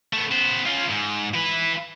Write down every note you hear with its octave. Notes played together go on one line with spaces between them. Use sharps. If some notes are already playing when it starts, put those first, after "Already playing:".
A3 B3
B3 C5
C#4 F4
G#2
E4 B4